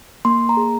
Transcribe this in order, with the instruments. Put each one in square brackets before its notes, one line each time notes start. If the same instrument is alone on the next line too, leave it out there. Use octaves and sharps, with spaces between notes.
[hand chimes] A#3 C6
A#5
G#4